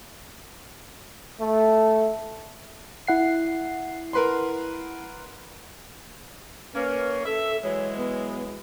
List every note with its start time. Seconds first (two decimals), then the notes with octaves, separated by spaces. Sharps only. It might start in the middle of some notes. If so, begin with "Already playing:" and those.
1.40 A3
3.07 E4 F#5 C7
4.13 A#4 B4 C6
6.74 A#3 C#4 B4
7.26 A4 E5
7.64 E3 F#3 G#3 C#5
7.98 B3